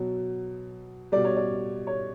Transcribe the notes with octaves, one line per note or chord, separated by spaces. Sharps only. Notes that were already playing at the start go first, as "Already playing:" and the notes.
Already playing: B2 F#3
B2 G3 D5
C#5
D5
C#5